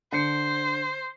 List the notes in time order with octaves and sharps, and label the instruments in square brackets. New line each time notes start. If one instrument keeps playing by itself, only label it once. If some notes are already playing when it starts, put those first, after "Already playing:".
[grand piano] D3 C7 C#7 [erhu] C5